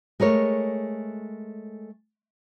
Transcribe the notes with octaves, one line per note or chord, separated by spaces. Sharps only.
G#3 A3 A#4 C#5